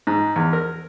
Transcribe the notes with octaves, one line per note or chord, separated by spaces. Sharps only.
G#2
E2
A#4